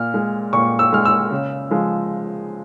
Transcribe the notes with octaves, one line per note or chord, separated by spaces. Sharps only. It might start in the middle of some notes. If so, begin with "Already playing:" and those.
Already playing: A#2 F6
G#3
A#2 C#6
E6
G#3 F6
E6
C#3
F3 G#3